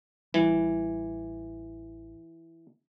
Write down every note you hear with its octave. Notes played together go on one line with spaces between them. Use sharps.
A1 E3 G3